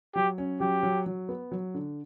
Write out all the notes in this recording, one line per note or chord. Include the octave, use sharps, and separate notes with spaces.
F#3 G4
C#4
F#3 G4
F#3
F#3
B3
F#3
D3